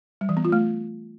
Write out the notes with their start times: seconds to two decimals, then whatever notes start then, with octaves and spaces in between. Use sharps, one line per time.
0.21 G3
0.29 E3
0.37 B3
0.45 F4
0.52 A3